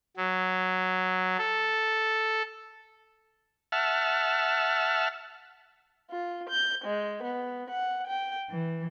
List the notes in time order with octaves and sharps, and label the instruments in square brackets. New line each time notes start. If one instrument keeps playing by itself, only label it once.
[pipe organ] F#3
A4
[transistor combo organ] E5 F#5 A5 F6
[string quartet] F4
G6
G#3
B3
F#5
G5
E3